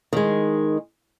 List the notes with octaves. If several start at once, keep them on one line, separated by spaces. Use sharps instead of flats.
D#3 G#3